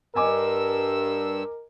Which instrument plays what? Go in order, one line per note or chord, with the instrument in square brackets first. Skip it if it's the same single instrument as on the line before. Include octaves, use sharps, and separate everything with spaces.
[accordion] G2 E6 [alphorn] A#4 [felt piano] D#5 G#5 D6